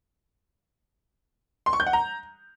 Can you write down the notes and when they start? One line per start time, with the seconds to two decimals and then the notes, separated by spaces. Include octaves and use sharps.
1.66 C6
1.73 C#6
1.80 G6
1.87 F#5
1.93 A#5